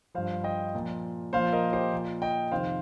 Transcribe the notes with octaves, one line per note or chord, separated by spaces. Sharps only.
G2 F3 C5 F5
D#5 G5
A#2 F3
A#2 F3 C5 F5
A#4 D#5
G4 C5
A#2 F3
D#5 G5
F2 C3 D#3 C5 F5